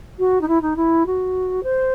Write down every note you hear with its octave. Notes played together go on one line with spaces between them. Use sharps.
F#4
D#4
E4
D#4
E4
F#4
C5